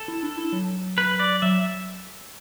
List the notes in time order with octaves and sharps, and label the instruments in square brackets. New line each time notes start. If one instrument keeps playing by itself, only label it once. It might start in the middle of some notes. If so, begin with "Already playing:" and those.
Already playing: [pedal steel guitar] A4
[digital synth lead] E4
D4
E4
F#3
[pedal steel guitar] B4
D5
[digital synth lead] F#3 [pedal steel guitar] E5